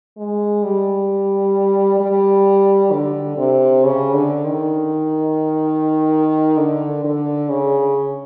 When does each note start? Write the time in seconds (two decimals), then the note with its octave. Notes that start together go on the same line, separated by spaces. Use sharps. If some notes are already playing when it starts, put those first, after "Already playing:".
0.17 G#3
0.63 G3
2.00 G3
2.92 D3
3.37 C3
3.84 C#3
4.13 D3
4.45 D#3
6.57 D3
7.04 D3
7.49 C#3